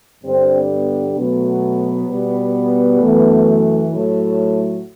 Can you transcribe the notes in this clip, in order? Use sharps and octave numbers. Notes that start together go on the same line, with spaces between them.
G2 D3 G3 C4
B3
B2 F#3 A3 B3
B2 G3
F#2 E3 A3
A2 F#3 A3